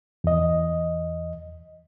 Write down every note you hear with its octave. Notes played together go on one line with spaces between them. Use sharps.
E2 D#5